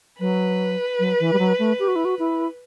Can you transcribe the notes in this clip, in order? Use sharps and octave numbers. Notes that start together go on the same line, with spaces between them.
F#3 B4
F#3
E3
G3
F#3
A3
G4
F#4
E4
F#4
E4